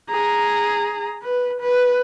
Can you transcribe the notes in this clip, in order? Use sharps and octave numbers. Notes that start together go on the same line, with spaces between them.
G#4 A#5
B4
B4